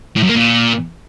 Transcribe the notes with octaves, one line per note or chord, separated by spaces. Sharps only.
A2
F#2
A#3
A#2